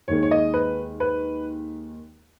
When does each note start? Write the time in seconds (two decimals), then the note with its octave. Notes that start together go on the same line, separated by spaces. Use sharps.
0.08 D#2 D#3 G#3 C#5
0.23 C#5
0.31 D#5
0.54 B4
1.00 B4